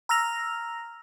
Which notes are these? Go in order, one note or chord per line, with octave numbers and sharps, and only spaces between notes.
A#5 E6 F6 A#6 F7